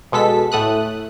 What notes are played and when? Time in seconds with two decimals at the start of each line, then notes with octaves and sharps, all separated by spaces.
0.12 B2 G#3 A4 B6
0.52 A2 A3 D#6 F#6